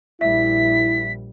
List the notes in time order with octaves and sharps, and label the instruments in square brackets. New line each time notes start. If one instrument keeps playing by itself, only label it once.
[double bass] A#1 G3 [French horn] E4 [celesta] E5 [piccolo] B6